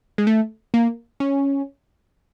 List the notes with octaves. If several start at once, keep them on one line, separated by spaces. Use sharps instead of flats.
G#3
A3
A#3
C#4